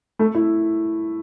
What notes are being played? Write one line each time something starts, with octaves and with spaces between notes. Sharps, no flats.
A3
E4